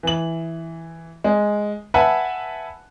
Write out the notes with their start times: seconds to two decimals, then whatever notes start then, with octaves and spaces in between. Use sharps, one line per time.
0.03 E3 F#7
1.24 G#3
1.94 B4 E5 F#5 G#5 A5 B5